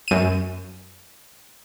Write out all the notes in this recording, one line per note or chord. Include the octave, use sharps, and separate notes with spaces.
F#2 D#7